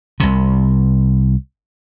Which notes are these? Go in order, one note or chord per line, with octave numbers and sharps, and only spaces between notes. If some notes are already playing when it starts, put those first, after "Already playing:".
C2 C3